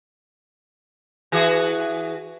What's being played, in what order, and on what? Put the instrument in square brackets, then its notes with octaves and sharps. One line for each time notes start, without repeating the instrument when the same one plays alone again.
[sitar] E3 F#4 G#4